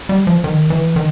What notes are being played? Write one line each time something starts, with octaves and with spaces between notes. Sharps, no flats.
G3
F3
D#3
E3
D#3